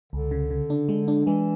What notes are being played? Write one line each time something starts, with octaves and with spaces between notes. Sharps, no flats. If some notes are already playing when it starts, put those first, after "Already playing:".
C#2 D3
C#3
C#3
D4
G#3
D4
E3 G#3